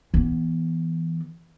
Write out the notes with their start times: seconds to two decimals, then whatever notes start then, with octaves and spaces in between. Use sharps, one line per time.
0.14 E3 B3